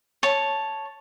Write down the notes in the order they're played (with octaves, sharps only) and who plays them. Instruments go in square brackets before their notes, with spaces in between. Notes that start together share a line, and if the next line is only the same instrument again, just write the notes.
[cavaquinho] C#5 A5